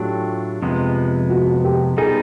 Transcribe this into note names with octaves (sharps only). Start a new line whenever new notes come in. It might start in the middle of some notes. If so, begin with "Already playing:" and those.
Already playing: A2 F#3 A3 D4 F4 G4
F2 C3 F3 G#3 B3
F#4
G4
B2 G3 B3 D#4 G#4